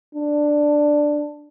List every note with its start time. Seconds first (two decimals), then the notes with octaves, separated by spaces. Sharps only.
0.15 D4